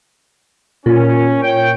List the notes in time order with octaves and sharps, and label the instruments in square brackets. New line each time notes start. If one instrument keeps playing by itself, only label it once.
[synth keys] A#2 [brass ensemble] C#4
[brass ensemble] C#5 G5